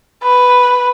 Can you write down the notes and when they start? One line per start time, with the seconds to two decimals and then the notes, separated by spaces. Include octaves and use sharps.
0.23 B4